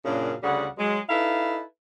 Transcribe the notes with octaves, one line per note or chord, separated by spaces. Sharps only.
F#2 A#2 C#3 D4
D2 C#3 G3 F#5
F#3 G#3
D#4 E4 A4 B4 F5